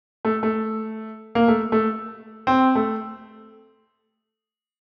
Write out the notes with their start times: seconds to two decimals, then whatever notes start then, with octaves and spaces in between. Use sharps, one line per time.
0.25 A3
0.43 A3
1.35 A#3
1.48 A3
1.72 A3
2.47 C4
2.75 A3